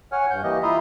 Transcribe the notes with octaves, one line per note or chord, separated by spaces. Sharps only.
C#5 F#5 G#5 F6
G2 G6
E3 A#3 G4 D#5
E4 F4 E5 A#5 C6 D#6